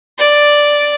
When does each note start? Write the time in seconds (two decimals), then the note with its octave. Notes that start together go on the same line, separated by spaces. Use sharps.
0.18 D5